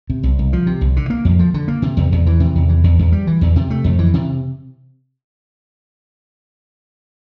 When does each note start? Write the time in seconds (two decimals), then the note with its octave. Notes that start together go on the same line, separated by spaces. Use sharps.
0.10 C3
0.23 C2
0.39 C2
0.53 F3
0.67 C3
0.81 C2
0.96 D3
1.10 A#3
1.25 F2
1.39 F3
1.54 D3
1.68 A#3
1.82 C3
1.97 E2
2.12 E2
2.26 E3
2.40 C3
2.55 E2
2.69 E3
2.84 E2
2.99 E2
3.12 G3
3.27 E3
3.41 E2
3.56 C3
3.70 A3
3.84 F2
3.99 E3
4.14 C3